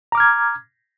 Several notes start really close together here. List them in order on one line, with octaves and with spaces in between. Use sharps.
A#5 D6 F6 G#6